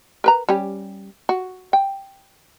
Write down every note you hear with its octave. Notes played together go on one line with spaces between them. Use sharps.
A#4 B4 A#5
G3 C#4 G4
F#4
G5